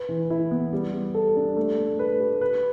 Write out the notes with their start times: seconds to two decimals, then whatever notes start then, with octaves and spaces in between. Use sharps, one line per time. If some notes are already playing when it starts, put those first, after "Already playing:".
Already playing: B4
0.09 E3
0.30 E4
0.51 B3
0.73 G3
0.93 G3
1.14 A4
1.36 D4
1.57 A3
1.78 A3
1.99 B4
2.20 G4
2.41 B4